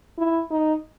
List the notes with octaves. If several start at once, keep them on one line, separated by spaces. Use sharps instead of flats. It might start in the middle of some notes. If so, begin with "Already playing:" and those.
E4
D#4